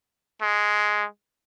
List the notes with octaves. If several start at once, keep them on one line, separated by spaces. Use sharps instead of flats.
G#3